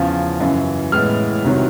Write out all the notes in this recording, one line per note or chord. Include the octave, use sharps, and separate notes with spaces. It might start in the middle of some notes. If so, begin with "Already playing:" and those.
Already playing: E2 C#3 F3
F#2 C#3 E3
A2 E3 G#3 B3 F6
C2 C3 D#3 F#3